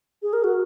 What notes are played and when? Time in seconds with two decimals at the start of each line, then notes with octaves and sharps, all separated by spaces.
0.22 G#4
0.33 A#4
0.44 F#4